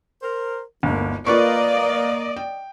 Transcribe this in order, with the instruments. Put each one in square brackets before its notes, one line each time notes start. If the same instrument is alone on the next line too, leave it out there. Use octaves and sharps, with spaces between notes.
[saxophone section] A#4 C5
[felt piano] G1 D2 [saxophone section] D#3 G#3 A#3
[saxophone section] A#3 [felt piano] F4 B4 C#6 [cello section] D5 D#5
[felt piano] G5